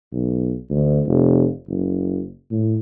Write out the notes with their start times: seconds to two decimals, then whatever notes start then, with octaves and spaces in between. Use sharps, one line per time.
0.12 B1
0.70 D2
1.07 F1
1.68 F#1
2.51 A2